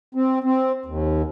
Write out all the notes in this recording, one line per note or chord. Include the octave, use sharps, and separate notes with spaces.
C4
C4
D#2